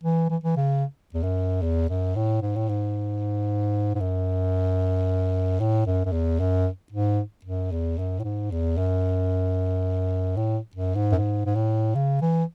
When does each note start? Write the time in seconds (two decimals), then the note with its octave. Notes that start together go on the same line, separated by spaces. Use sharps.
0.03 E3
0.30 E3
0.44 E3
0.56 C#3
1.14 E2
1.23 F#2
1.62 E2
1.89 F#2
2.16 A2
2.42 G#2
2.56 A2
2.69 G#2
3.95 G#2
4.00 F#2
5.60 A2
5.86 F#2
6.05 F#2
6.12 E2
6.39 F#2
6.92 G#2
7.45 F#2
7.72 E2
7.98 F#2
8.19 A2
8.24 G#2
8.51 E2
8.77 F#2
10.37 A2
10.75 F#2
10.95 G#2
11.12 F#2
11.15 G#2
11.46 G#2
11.55 A2
11.95 C#3
12.21 E3